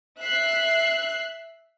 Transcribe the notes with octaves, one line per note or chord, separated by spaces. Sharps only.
E5 F#6 C7